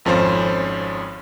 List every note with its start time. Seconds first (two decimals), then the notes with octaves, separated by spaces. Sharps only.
0.05 G#1 F2 F3 C#4 C5